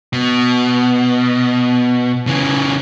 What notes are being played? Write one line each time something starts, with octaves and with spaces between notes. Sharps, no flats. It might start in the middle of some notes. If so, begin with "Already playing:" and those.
B2
C#3 E3